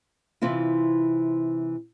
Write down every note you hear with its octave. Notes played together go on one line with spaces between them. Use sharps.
C3 E3 C4 E4 F4